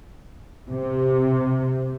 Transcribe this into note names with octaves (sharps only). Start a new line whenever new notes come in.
C3